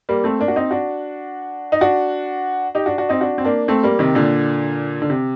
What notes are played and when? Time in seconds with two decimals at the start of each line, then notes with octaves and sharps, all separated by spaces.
0.09 G3 A#3
0.24 A3 C4
0.39 A#3 D4
0.48 F#4
0.56 C4 D#4
0.71 D4 F#4
1.72 D#4
1.81 D4 F#4
2.75 D#4 G4
2.86 D4 F#4
2.98 D4 F#4
3.09 C4 D#4
3.21 D4 F#4
3.38 C4
3.45 A#3 D4
3.68 A3 C4
3.83 G3 A#3
3.99 C3 D#3
4.15 A#2 D3
5.02 D3
5.10 C3